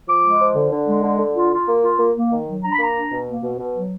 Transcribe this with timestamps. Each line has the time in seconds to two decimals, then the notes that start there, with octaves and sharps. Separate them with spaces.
0.08 F3 D6
0.24 G#3
0.40 F3
0.56 D3
0.72 D3
0.88 G#3
1.04 D3
1.19 D3
1.35 F4
1.52 F4
1.68 A#3
1.84 F4
1.99 A#3
2.16 A#3
2.32 D#3
2.47 F#3
2.63 D4 A#5
2.72 B5
2.79 A#3 A#5
2.95 D4
3.12 B2
3.27 A#3
3.43 B2
3.59 B2
3.75 F#3